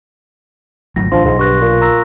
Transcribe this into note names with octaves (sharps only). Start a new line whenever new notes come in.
G#1 F#3 A3 A#6
G#1 F3 D4 C6
B1 G#2
G2 C#6 F#6 A#6
A#2 C#6
A#5 E6 A#6